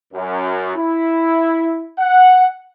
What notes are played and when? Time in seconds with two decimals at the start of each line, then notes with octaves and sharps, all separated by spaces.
0.14 F#2
0.76 E4
1.99 F#5